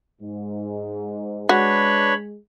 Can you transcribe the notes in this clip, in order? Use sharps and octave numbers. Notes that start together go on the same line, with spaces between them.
G#2
G#3 D4 F#4 B4 C#5 B5